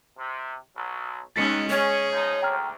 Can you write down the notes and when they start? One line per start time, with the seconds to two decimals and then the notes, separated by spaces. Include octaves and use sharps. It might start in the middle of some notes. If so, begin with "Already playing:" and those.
0.17 C3
0.77 B1 F#3
1.36 D#2 G#3 C#4 D#4 A6 B6 C#7
1.70 C#4 G#4 C#5
2.12 G#2 F3 D#4
2.43 D2 G5 A#5 F6